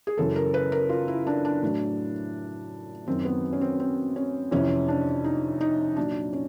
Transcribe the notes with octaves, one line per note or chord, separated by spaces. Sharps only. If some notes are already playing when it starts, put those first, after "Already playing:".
G#4
F#2 C#3 E3 A4
A#4
B4
A#4
F4
E4
D4
D4
A2 F#3
F#2 D#3 F#3 C4
B3
C#4
C4
C4
C#4
F2 C3 E3 C#4
D4
D#4
D#4
A#2 F#3 D4
C#4